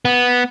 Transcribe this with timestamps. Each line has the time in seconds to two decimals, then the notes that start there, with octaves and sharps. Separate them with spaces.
0.05 B3